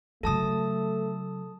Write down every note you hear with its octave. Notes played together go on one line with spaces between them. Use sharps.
C#3 F#3 A3 A4 A5 D#6